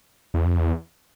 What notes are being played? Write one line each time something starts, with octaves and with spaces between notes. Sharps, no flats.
E2
F2
E2